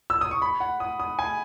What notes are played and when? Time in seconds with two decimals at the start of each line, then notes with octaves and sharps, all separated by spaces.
0.10 E6
0.21 D#6
0.31 C#6
0.42 B5
0.60 F#5
0.80 D#6
1.00 D#6
1.19 G#5